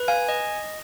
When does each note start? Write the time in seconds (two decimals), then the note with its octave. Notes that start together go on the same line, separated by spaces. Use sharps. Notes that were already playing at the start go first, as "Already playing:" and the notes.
Already playing: B4
0.08 F5 G#5
0.29 D#5